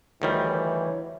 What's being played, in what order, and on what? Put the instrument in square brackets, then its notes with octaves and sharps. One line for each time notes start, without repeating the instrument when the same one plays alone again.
[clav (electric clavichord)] D2 D#3 G3 [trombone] E3 [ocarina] C#5